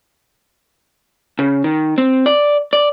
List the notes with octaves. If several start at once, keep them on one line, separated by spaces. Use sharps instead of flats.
C#3
D#3
C4
D5
D5